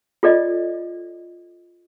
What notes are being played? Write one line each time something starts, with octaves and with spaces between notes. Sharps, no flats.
F4 A4 D5 D#5